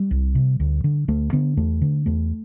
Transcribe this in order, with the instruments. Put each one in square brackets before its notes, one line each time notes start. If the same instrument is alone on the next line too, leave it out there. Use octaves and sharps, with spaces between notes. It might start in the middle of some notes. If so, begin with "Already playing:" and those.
Already playing: [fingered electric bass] G3
C2
C3
D2
D3
D2 A3
D3 B3
E2 A3
D3
E2 A3